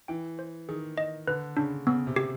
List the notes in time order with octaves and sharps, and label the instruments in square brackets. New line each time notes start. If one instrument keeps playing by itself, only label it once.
[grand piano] E3 [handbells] G5
[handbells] C5
[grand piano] D#3 [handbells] G#4
[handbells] D#5
[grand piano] D3 [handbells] B4
[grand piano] C#3 [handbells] D4
[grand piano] C#3 [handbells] B3
[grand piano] C3
[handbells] G4